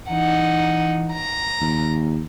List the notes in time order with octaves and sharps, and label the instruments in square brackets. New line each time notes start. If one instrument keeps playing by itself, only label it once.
[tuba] E3 [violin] D#4 F#5
[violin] A#5
[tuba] D#2